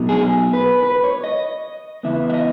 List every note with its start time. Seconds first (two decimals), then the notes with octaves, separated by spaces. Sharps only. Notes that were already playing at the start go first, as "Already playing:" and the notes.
Already playing: B2 F#3 A3 D#4
0.09 G#4
0.53 B4
0.83 B4
1.04 C#5
1.24 D#5
2.03 E2 C#3 E3 B3 E5
2.30 E5
2.34 D#5